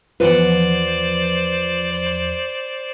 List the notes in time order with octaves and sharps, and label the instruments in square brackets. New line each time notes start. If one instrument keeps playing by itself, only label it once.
[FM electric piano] E2 F3 [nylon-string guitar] B4 F#5 [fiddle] C5 D5